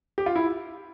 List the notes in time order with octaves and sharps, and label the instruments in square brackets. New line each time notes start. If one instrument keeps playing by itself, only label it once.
[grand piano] G4
F4
E4